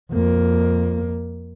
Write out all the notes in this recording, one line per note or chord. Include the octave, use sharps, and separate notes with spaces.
F2 A#3